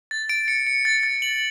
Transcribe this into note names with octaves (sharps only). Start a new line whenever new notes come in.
A6
D7
C#7
C#7
A6
A6
F#7